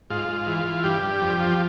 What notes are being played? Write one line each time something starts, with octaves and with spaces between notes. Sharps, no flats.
G#2 F4
G#2
E3
E3
G2 G4
G2
F2
F3